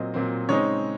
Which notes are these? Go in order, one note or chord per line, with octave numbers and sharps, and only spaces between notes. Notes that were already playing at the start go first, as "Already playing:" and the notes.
Already playing: A#2 F#3 C4 D#5
A#2 F#3 C4
C#3 G#3 C4 D#4 C#5